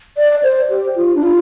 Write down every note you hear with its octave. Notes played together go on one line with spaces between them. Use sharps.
D5
C5
G4
F4
D4
F4